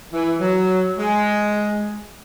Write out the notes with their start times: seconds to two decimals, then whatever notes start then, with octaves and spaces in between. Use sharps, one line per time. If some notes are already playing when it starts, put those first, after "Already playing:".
0.12 E3
0.40 F#3
0.97 G#3